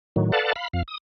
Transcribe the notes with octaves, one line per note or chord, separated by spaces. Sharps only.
A2 D#3 F#3
A4 B4 D5 F5 F#5 A5
F5 B5
F2 F5
D#6